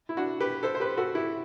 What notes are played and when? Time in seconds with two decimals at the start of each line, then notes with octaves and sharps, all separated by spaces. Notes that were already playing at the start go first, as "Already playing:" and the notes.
0.09 E4
0.17 D4 F#4
0.40 G4 B4
0.63 A4 C5
0.75 C5
0.80 G4 B4
0.97 F#4 A4
1.15 E4 G4